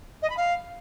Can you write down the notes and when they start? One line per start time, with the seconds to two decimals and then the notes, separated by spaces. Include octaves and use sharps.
0.22 D#5
0.29 B5
0.37 F5